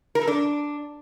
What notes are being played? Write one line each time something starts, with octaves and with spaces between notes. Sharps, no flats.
A#4
A4
D4